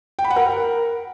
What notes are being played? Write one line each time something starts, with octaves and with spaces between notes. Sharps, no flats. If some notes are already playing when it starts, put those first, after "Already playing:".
G5
B5
F#5
A#4